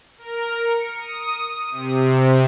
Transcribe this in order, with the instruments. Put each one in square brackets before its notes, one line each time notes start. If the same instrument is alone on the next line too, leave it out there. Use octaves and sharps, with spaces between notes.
[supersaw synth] A#4
C#7
D#6
C3